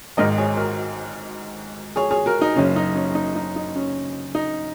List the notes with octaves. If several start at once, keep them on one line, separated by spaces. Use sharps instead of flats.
G#1 G#2 D#3 A#4 D#5
G#4 C#5
F#4 A#4
G#4 C#5
G#4 C#5
F#4 A#4
D#4
F#1 F#2 C#3 C#4
D#4
C#4
D#4
D#4
D#4
C#4
D#4